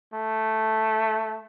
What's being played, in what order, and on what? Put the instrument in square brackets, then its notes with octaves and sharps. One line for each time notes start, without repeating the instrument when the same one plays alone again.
[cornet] A3